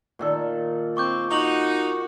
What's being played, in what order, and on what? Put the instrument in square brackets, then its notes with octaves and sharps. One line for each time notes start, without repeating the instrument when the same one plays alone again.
[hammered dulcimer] A#2 D#3 A4
[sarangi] C4 [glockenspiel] C#6 D6 G6
[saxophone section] D#4 [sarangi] F#4 [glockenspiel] C#6 F#7